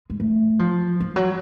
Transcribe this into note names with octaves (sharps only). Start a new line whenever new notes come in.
G#3
A3
F3
F3
F#3